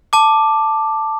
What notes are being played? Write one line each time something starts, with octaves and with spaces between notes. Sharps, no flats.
A5 D6